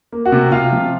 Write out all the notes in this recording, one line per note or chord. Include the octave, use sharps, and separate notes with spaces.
A#3
F#4 F#5
C3
C3 F4 F5
F3